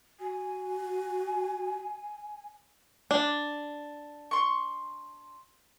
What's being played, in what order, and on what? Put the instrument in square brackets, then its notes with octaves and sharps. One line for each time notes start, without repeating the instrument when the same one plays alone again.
[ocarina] F#4 [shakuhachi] G#5
[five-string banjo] D4
[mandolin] C6 C#6